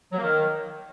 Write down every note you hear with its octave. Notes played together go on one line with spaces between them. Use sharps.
F#3
A#3
D#3